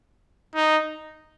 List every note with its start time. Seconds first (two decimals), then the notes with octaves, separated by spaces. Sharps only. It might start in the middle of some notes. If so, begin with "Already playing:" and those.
0.56 D#4